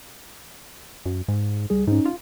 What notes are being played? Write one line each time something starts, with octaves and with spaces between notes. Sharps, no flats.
F#2
G#2
C#2 G3 G#4
G#2 C#4 D#4
F4